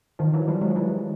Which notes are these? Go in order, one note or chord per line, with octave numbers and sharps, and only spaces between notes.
D#3 F3
E3 F#3
F3 G3
F#3 G#3
F3
E3 F#3